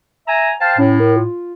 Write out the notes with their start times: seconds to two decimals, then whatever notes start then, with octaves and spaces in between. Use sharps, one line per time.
0.27 E5 G#5 A#5
0.60 C5 F5 G5 A5
0.78 A2 C#4
1.00 A#4
1.16 F4